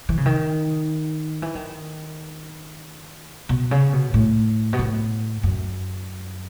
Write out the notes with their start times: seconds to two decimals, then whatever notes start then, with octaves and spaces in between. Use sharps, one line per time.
0.09 E3
0.17 C#3
0.26 D#3
1.42 E3
1.55 D#3
3.49 B2
3.71 C#3
3.93 B2
4.14 A2
4.73 B2
4.79 A2
5.43 F#2